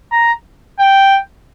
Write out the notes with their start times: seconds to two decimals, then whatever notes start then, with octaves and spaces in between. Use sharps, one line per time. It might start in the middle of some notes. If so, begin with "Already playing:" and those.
0.12 A#5
0.80 G5